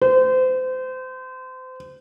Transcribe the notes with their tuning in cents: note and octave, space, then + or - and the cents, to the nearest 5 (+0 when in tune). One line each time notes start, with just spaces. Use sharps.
C5 -30